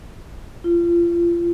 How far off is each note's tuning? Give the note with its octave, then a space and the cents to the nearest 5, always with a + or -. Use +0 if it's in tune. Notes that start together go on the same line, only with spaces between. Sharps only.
F4 -30